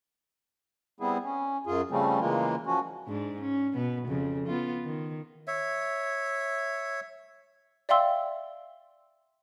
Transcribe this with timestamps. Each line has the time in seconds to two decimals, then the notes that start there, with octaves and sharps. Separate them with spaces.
1.00 G3 B3 C4 E4 G#4
1.24 C#4
1.67 F#2 F4 G#4
1.91 C#3 F3 G3 A3 C4 C#4
2.20 C#3 E3 G#3 A#3 F4
2.67 F3 C#4 F#4
3.07 G#2 D4
3.41 C#4
3.74 B2 B3
4.07 F2 C#3
4.47 B3 F4
4.85 D#3
5.47 C#5 E5
7.89 D5 E5 F5 G5 C6 E6